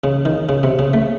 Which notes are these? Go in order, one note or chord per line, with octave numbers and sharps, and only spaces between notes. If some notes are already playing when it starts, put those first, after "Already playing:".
C#3
D#3
C#3
C3
C#3
A3